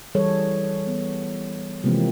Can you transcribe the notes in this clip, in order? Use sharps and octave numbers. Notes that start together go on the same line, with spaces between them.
E3 G3 G#4 A4 C#5
B3
C3 E3 F3 G#3 A#3 C4